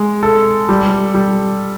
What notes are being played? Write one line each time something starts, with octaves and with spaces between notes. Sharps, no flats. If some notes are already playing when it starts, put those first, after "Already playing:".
Already playing: G#3
A4
G3
G3